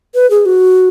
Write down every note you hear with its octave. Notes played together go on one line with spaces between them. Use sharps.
B4
G#4
F#4